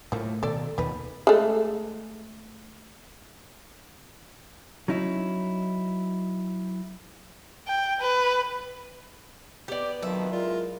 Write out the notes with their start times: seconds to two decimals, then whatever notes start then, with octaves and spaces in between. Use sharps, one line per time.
0.12 A2 F3 A3 A#3
0.43 B2 D#3 A4 D5
0.78 D#2 B2 D3 B3 D#4 B4
1.27 G#3 A3
4.88 F#3 C#4 D#4 E4
7.67 G5
8.01 B4
9.68 B3 G4 D5
10.03 F2 B2 D#3 F#3 E5
10.32 G#3 E4 F4 A#4 D5